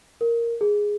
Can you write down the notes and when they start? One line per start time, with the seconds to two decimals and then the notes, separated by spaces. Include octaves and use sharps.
0.21 A#4
0.61 G#4